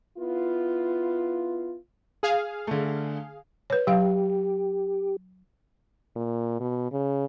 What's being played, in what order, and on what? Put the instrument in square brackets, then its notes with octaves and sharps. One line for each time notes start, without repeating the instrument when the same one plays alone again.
[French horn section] B3 E4 F4
[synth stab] G#4 F5
[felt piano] D3 A3
[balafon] B4 C#5
[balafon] F#3 F5 [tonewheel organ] G4
[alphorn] A#2
B2
C#3